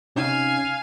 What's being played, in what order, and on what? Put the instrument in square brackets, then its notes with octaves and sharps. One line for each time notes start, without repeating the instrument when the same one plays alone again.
[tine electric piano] C3 C#4 D#4 [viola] F5 G#5